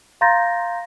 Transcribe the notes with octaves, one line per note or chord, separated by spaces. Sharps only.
F5 A#5 C6 G6 A6 A#6